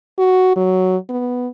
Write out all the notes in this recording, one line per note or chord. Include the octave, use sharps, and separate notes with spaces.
F#4
F#3
B3